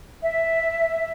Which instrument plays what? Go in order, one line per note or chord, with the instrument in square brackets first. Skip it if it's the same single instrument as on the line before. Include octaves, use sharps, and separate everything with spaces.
[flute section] E5